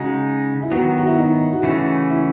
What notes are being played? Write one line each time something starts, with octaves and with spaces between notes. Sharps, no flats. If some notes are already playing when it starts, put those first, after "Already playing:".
Already playing: C#3 G#3 D#4 F#4
E4
D#3 F#3 B3 F#4
F#4
E4
D#4
F#4
C#3 E3 A3 C#4 E4 F#4
E4